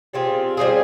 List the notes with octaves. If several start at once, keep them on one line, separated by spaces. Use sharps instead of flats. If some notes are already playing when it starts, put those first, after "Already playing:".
G3 C4 F4 G#4
G3 C4 F4 G#4